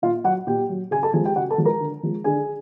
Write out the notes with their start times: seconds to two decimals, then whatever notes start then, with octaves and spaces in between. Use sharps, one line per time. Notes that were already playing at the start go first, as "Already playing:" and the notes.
0.02 A#2 F4 F5
0.24 F#3 F#4 F#5
0.47 A#2 G4 G5
0.69 F#3
0.91 C#3 G#4 G#5
1.03 A4 A5
1.13 F3 G#4 G#5
1.17 G#3
1.24 G4 G5
1.36 C#3 F#4 F#5
1.50 A4 A5
1.58 F3 G#3
1.65 A#4 A#5
1.80 D3
2.03 F3 G#3
2.24 D3 G#4 G#5